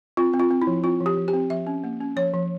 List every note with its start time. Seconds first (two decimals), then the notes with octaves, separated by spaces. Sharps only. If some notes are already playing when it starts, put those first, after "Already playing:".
0.17 C4 F4
0.33 C4
0.39 F4
0.51 C4
0.62 E4
0.67 F3
0.84 C4 F4
1.00 F3
1.06 G4
1.17 F3
1.28 G4
1.34 C4
1.50 F3 E5
1.67 C#4
1.84 A#3
2.01 C#4
2.16 F3 C#5
2.34 F3